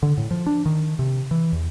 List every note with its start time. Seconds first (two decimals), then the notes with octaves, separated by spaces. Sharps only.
0.03 D3
0.18 A2
0.31 F3
0.46 D4
0.66 D#3
0.99 C3
1.31 E3
1.53 E2